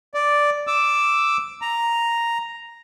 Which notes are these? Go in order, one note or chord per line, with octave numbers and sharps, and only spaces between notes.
D5
D6 E6
A#5